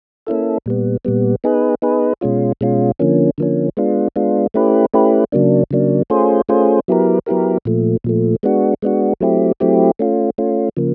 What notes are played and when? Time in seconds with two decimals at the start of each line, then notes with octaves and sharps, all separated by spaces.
0.27 A#3 C#4 E4 A4
0.66 A#2 G3 B3
1.05 A#2 G3 B3
1.44 B3 D#4 G#4 B4
1.82 B3 D#4 G#4 B4
2.21 B2 G#3 C#4 F4
2.61 B2 G#3 C#4 F4
2.99 D3 F3 A#3 C#4
3.38 D3 F3 A#3 C#4
3.77 G#3 B3 D4 F4
4.16 G#3 B3 D4 F4
4.54 A3 C#4 E4 G4 B4
4.94 A3 C#4 E4 G4 B4
5.32 C#3 F#3 A#3 D4
5.71 C#3 F#3 A#3 D4
6.10 A3 C#4 F4 G#4 C5
6.49 A3 C#4 F4 G#4 C5
6.88 F#3 B3 E4 G4 A#4
7.26 F#3 B3 E4 G4 A#4
7.65 A#2 F3 A3
8.04 A#2 F3 A3
8.43 G#3 B3 D4 F#4
8.82 G#3 B3 D4 F#4
9.20 F#3 A3 C4 E4 G4
9.60 F#3 A3 C4 E4 G4
9.99 A3 C#4 F4
10.38 A3 C#4 F4
10.77 C#3 F3 A#3